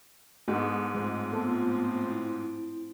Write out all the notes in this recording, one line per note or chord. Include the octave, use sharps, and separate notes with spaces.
G#2 B3 D4 D#4 F#4 A4
A2 F3 G#3 C4
B3 F4 A4
E4